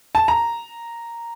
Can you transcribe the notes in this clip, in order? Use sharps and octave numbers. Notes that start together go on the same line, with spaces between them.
A5
A#5